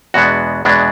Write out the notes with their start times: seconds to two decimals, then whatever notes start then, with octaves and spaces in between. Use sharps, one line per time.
0.14 E2 B2 G#3 B3 D4 F#4
0.65 E2 B2 G#3 B3 D4